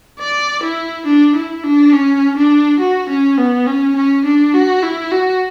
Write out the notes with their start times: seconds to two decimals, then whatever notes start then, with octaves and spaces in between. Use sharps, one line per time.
0.19 D5
0.63 E4
1.06 D4
1.35 E4
1.64 D4
1.93 C#4
2.37 D4
2.80 F#4
3.09 C#4
3.38 B3
3.67 C#4
3.96 C#4
4.25 D4
4.54 F#4
4.83 E4
5.12 F#4